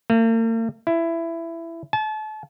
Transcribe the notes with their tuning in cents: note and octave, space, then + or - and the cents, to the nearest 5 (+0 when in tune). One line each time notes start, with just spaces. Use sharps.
A#3 -45
E4 +15
A5 -35